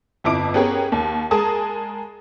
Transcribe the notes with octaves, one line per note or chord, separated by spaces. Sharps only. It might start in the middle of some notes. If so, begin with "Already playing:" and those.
G1 F2 E4 D6 D7
B3 C#4 G4 G#4 A#4 C#5
D#2
G#3 G#4 A#4 G#5 A5 D#6